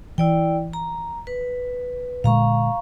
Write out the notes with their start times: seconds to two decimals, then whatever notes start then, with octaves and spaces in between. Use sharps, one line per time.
0.18 E3 E4 D5 G5
0.73 A#5
1.27 B4
2.24 A#2 D3 G#3 F5 A#5 C#6